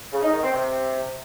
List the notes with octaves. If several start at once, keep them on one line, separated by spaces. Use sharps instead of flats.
C#3
D#4
D#3
C4
C3